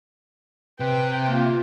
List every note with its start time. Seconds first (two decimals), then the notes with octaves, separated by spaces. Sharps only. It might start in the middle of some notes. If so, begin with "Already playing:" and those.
0.80 C3 B4 G5
1.26 A#3 F4